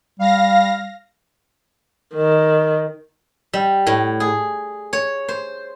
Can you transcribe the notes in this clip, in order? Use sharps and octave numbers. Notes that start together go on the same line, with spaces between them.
G3 F5 A#6
D#3
G3
A2
G#4
C#5
C5